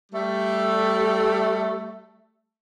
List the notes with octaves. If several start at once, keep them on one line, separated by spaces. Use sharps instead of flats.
G3 A3